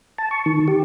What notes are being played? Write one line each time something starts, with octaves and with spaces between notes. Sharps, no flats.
A5
C#6
D#3
G4